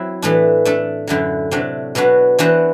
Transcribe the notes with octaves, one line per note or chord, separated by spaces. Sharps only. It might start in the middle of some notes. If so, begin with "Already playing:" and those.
Already playing: F#3 C4 E4
A2 E3 A3 D4
A3 D4 A4
F#2 D3 F#3 A3 E4
C3 F#3 A3 D4
B2 F#3 B3 D4 F#4
E3 B3 D4 F#4 C5